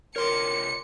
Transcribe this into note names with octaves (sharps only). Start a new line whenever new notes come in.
C3 F4 A#4 C#5 C6 D6 C#7